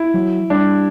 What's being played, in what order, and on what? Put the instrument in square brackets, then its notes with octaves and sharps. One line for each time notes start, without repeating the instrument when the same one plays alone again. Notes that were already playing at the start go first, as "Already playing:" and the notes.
Already playing: [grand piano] E4
[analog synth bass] F#3
[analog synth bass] G3 [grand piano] D4